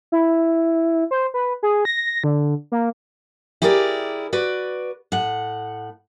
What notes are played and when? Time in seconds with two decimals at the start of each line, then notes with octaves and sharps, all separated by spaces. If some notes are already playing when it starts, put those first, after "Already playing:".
0.12 E4
1.11 C5
1.34 B4
1.63 G#4
1.85 A#6
2.24 D3
2.72 A#3
3.62 E4 G4 G#4 A#4 C#5 D5
4.33 F#4 B4 D5
5.12 A2 F#5